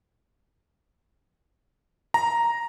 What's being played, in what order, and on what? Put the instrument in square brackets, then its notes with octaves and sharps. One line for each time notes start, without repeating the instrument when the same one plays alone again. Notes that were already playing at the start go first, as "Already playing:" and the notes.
[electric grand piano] A#5